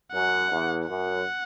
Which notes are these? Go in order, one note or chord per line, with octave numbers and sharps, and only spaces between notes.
F#2 F#5
E2
F#2 F#5